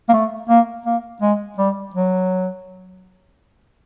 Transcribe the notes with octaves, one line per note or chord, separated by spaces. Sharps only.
A#3
A3
A#3
A#3
G#3
G3
F#3